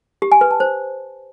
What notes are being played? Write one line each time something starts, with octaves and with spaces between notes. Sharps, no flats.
G4
G#5
B4
A5
C5